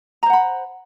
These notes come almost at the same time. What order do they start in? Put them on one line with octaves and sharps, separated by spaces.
A#5 C5 F#5 B5